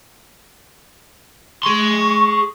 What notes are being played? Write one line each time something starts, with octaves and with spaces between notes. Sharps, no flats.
G#4 C6 C#6